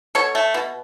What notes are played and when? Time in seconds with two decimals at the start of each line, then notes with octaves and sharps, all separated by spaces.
0.15 B2 A4 C#5
0.35 A3
0.54 B2